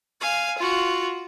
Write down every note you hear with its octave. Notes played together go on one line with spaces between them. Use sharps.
F5 G#5
F4 F#4